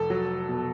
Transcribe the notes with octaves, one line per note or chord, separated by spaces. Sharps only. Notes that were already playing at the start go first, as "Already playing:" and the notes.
Already playing: F1 A4
F#3
B2